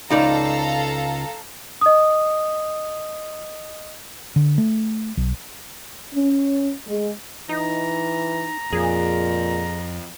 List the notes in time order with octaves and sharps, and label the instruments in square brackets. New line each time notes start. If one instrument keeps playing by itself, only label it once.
[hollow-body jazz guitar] C#2 D#4 D5 [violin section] A4 F5 A#5
[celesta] D#5 D#6
[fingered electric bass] D3
A3
B1
[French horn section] C#4
G#3
[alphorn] E3 [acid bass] D#4 [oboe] A#5
[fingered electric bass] F2 [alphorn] A#2 [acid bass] G#4